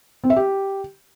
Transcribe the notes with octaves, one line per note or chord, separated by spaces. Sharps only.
C4
E5
G4